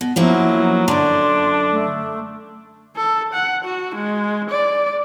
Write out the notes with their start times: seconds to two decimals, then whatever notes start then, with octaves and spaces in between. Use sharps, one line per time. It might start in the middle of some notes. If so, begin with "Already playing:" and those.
0.01 B2
0.16 F#2 F3 F#3 A#3 E4
0.88 F#2 D3 D4 C6
1.71 A3
2.97 A4
3.33 F#5
3.65 F#4
3.95 G#3
4.50 D5